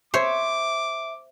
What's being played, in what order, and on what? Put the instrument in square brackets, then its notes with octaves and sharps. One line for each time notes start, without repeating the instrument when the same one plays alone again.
[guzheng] C5 C#5 [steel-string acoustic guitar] E5 [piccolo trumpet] D6